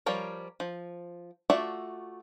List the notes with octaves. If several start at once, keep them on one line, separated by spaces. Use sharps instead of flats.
F3 G3 F4 A#4 C#5
F3
A3 F4 F#4 D5 E5